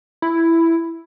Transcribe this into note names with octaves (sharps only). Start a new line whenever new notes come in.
E4